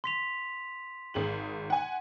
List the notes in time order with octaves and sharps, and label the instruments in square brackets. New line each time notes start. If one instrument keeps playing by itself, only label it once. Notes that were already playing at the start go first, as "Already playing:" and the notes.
[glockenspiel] C6 B6 F7
[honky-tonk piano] G#1 G#4 F#7
F#5 G#5